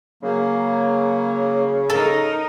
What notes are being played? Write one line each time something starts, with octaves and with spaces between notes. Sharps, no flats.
C#3 F#3 A#3
D#4 A4 A#4